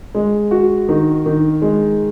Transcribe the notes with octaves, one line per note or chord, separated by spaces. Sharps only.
G#3
F#4
D#3
D#3
G#3